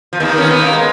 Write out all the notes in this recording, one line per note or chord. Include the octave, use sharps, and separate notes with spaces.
F3
D#2 D#3
C#4
B3
A#3
G#3